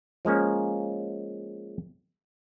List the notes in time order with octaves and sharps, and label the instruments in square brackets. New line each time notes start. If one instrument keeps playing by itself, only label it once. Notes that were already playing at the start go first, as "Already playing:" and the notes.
[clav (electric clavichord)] F3 G#3 A#3 C#4